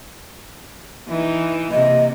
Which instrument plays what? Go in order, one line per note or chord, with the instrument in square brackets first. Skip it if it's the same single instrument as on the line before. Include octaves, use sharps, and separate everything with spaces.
[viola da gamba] E3 D#4
[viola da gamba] C3 A#3 [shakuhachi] D#5